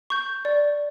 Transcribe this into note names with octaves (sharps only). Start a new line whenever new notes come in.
C#6 G6
D5